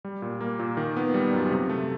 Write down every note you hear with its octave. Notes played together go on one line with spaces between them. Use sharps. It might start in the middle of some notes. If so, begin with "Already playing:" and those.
G3
A#2
A#3
A#2
D#3
B3
G3
F#2
C3
A3